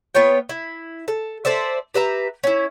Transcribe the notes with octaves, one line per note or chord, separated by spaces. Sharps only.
B3 F4 C#5 G5
E4
A4
A4 C5 D5 E5
G4 B4 E5 A#5
C#4 E4